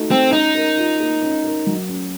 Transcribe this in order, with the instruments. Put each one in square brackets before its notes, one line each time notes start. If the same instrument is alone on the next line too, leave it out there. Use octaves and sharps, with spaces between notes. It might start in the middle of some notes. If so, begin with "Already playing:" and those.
Already playing: [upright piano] A3 D#4 F#4
[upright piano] A3 [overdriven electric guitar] C4
[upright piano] C#4 [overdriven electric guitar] D#4
[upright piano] A#4
F4
A#3
C#4
A#4
F#3
C#4